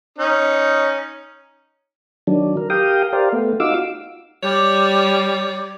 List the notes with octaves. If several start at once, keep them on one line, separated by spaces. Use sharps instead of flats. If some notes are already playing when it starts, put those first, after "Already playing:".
C#4 D#4
D#3 F#3 D4
A#4
G4 A#4 F5 G5 D#6
G4 A#4 C5 D5 F5
A3 B3
D#4 F4 F#4 F5 D6 E6
G3 C#5 D5